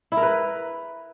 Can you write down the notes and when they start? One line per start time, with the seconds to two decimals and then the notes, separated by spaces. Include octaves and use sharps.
0.12 E4
0.17 A#4
0.22 B4